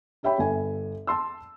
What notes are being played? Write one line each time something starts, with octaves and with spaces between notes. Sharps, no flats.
G4 C#5 E5 G5 B5
G1 A4 G#5
A5 C6 E6